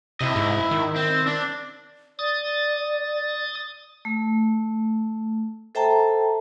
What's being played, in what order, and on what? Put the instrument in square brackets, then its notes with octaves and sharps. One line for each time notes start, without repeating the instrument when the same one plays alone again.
[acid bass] C3 [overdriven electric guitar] E4 D#5
[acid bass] G#2
D#3
[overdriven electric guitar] C4
D4
[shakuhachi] D5 [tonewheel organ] D#6 A6
[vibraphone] A3
A4 C5 E5 G5 A5 A#5